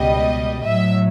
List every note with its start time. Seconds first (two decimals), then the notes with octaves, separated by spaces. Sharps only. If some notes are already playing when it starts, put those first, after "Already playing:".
Already playing: C#2 B2 G3 D#5
0.66 A2 F#3 E5